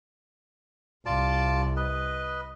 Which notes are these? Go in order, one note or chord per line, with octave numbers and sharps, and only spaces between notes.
C2 F4 D5 A5
B4 D#5